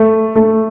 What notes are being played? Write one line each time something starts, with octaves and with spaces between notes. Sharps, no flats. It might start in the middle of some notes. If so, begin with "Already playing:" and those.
Already playing: A3
A3